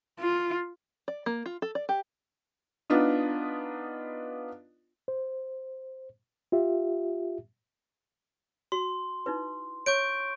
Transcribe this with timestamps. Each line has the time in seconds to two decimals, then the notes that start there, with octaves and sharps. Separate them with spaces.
0.20 F4
1.08 D5
1.26 A#3
1.46 F4
1.62 A4
1.75 D5
1.89 G4
2.90 B3 D4 D#4 F4
5.08 C5
6.52 F4 G4 E5
8.72 F#4 C6
9.26 D#4 E4 B4
9.86 C#5 C#6 G6 D7